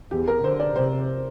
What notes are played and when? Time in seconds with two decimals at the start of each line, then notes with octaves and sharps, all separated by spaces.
0.11 E2 G4
0.28 A#4
0.43 D3 C5
0.60 D5
0.76 C3 C5